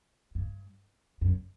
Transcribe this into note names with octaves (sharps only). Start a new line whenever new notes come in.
G2
F#2